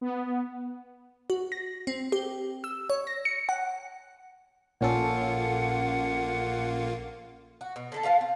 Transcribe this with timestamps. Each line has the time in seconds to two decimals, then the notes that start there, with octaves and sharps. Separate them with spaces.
0.01 B3
1.30 F#4
1.52 A#6
1.87 C4
2.12 G4
2.64 E6
2.90 C#5
3.07 A#6
3.25 C#7
3.49 F#5
4.81 A#1 A#2 A#3 C#4 F4 A4 F#5
7.61 F#4
7.76 B2
7.92 D3 A4 A5
8.03 F4 B4 F5 A5
8.21 C4